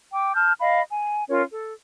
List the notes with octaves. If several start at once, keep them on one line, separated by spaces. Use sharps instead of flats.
G5 D6
A5 F6 G6
D#5 F5 B5
G#5
C#4 F4 A#4 C#5
A4